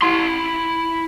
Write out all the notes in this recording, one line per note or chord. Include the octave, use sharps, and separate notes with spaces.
E4 C6